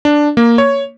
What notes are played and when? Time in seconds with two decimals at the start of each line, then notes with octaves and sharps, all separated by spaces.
0.05 D4
0.37 A#3
0.58 C#5